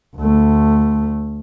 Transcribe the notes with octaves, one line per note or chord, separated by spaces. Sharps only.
D2 A3